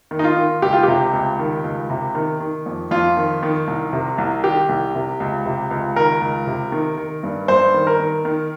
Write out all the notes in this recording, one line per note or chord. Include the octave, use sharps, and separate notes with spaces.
D#3
D#4
F4
D#3
C#2 G4
F4
C3 G4
C#2
D#3
C#2
C3
D#3
D#3
F2
F2 F4
D#3
D#3
C2
C3
C2
D#3 G4
C2
C3
C#2
C3
C#2
D#3 A#4
C#2
C3
D#3
D#3
G2
G2 C5
D#3
A#4
D#3
D#3